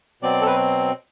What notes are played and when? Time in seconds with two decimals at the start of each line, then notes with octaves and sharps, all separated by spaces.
0.22 B2 F#3 C4 D5
0.41 A4
0.46 B4